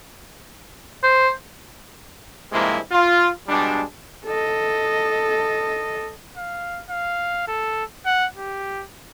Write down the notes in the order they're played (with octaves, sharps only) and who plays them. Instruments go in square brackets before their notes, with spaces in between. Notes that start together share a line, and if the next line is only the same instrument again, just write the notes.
[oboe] C5
[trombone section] G2 C3 F3 G#3 A#3 E4
F4
B2 G3 G#3 D4
[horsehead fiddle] A4 D#5
[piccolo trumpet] F5
F5
A4
F#5
G4